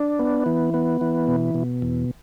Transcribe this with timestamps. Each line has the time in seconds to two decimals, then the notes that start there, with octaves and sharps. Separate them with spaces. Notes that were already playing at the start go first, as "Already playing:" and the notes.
Already playing: D4
0.19 B3
0.46 E3
0.74 B3
1.01 E3
1.28 B2
1.54 B2
1.82 E2